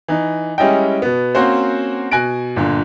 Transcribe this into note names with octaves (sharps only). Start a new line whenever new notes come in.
E3 D#4
G3 G#3 C#4 E4 D#5 G5
B2 B3
A#3 C4 C#4 F#4 C5
B2 G#5 F#6 A#6 D7
G1 A#2 D3